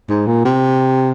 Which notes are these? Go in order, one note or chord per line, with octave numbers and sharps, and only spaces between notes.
G#2
A#2
C3